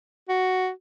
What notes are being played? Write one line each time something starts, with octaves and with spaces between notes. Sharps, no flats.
F#4